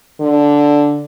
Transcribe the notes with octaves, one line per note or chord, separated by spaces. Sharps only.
D3